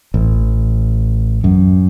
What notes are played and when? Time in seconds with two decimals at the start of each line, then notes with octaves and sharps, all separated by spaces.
0.14 A1
1.44 F#2